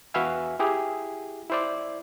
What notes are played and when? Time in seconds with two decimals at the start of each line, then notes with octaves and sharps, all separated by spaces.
0.14 E2 F#4 B4 E5 F5 G#5
0.59 E4 G4 G#4
1.50 E4 C5 D5